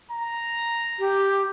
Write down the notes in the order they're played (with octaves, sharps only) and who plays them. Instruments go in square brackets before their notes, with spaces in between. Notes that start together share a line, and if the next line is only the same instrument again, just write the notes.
[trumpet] A#5
[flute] G4